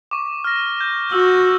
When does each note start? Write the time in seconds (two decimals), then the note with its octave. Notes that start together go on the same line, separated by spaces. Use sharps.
0.11 C#6 D6
0.44 F6 A#6
0.81 G6
1.12 F#4 E6